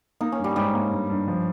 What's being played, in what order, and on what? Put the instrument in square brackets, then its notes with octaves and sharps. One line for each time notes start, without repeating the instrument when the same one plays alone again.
[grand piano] A#3 [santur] D#4
[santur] C#4
[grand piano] G2
[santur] G3
[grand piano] G#2 [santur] G3
[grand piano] A#3
G2
G2
F3